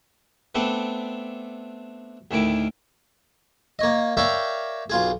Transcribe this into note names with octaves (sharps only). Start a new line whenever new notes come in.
A3 B3 C4 D4 A4 B4
D2 A2 D#3 E4 D6
A#3 C#5 D#5
A#4 C#5 D5 E5 F5 G5
B1 F4 G#4